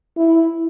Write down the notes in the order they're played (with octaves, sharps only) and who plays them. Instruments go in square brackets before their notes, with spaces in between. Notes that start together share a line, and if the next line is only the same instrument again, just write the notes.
[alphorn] E4